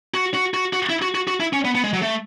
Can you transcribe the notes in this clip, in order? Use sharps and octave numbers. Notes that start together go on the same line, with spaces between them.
F#4
F#4
F#4
F#4
E4
F#4
F#4
F#4
E4
C#4
B3
B3
G#3
F#3
A3